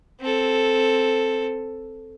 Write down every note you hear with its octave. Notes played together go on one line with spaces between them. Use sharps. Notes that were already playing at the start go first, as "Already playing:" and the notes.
C4 A4